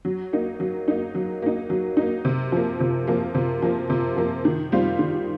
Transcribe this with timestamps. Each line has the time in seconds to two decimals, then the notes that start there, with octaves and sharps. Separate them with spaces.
0.05 F#3
0.33 A#3 D#4
0.60 F#3
0.88 A#3 D#4
1.15 F#3
1.42 A#3 D#4
1.70 F#3
1.97 A#3 D#4
2.25 C3
2.52 F3 A#3
2.80 C3
3.07 F3 A#3
3.35 C3
3.62 F3 A#3
3.90 C3
4.17 F3 A#3
4.45 D#3
4.72 G3 C4 F4
4.99 D#3